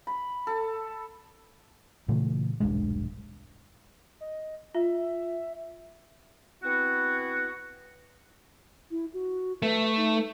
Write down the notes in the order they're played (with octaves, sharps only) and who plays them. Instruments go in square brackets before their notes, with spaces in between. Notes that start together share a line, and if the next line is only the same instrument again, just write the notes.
[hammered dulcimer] B5
A4
[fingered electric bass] A#2 C#3 E3 A3
D#1 B1 G2 G#3
[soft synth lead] D#5
[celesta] F4 [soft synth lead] E5
[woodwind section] B3 C4 E4 F#4
[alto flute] E4
F#4
[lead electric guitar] A3 [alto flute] B4
[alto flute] D#4